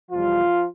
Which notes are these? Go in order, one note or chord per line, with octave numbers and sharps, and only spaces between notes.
E2 B2 F3 G3 F4